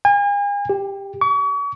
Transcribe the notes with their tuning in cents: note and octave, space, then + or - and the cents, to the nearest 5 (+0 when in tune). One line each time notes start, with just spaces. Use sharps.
G#5 -40
G4 +10
C#6 +40